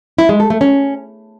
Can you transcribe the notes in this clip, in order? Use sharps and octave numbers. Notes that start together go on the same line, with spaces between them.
E4
G#3
A4
A3
C#4